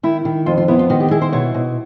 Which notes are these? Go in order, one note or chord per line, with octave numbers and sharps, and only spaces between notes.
D#3 E4
D#3
F2 F4
F4
B3 E4
F4
D#3 F#4
G4
E4 G#4
C5
B2 C#5
B2